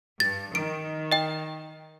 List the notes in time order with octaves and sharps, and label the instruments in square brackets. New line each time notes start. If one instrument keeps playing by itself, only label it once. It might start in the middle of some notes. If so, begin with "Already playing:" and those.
[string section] G2 [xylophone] A6
[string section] D#3 [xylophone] D7
[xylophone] D#5 G5